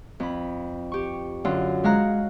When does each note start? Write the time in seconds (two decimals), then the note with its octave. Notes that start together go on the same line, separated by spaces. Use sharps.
0.20 F2 B5
0.92 G4 C#6
1.45 F#2 D3 F4
1.84 G#3 C#5 F5 A#5 F#6